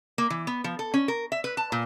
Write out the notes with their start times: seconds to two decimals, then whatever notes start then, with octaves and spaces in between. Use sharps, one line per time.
0.18 A#3
0.30 E3
0.47 B3
0.64 F3
0.79 A4
0.94 C#4
1.08 A#4
1.32 E5
1.44 B4
1.57 A5
1.72 A#2